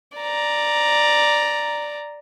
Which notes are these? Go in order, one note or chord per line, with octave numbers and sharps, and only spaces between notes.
D5 A#5